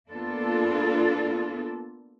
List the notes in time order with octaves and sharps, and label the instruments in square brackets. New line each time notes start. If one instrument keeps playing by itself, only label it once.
[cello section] A#3 B3 D4 F4 A4